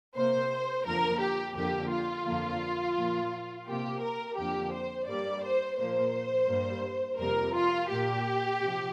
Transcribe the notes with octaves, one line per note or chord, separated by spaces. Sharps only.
C3 A#3 C5
F2 D3 F3 A#3 A#4
G4
F2 D3 A#3 G4
F4
F2 D3 F3 A#3
A#2 F3 A#3
C3 A#3 G4
A#4
F2 D3 F3 A#3 G4
C5
G2 G3 A#3 D5
C5
A#2 F3 A#3 C5
G2 G3 A#3
F2 C3 G3 A#3 A#4
F4
A#2 A#3 G4
C3 F3